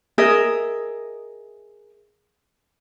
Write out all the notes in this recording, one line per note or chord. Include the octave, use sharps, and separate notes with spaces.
G#4 A#4 D#5 E5